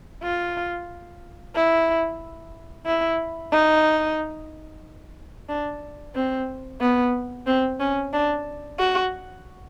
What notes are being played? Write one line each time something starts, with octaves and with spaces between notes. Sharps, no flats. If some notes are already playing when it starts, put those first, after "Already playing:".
F4
E4
E4
D#4
D4
C4
B3
C4
C#4
D4
F#4